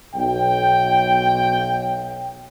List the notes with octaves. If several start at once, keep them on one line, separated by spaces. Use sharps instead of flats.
B1 G5